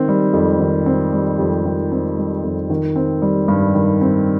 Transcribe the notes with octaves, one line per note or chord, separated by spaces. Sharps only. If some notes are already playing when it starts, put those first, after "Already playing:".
Already playing: D#3 C4
G3
F2
D#3
C4
G3
F2
D#3
C4
G3
F2
D#3
C4
G3
G2
D#3
C4